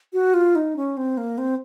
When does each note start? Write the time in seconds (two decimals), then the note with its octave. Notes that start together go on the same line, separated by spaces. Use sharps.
0.13 F#4
0.34 F4
0.55 D#4
0.76 C#4
0.97 C4
1.17 A#3
1.38 C4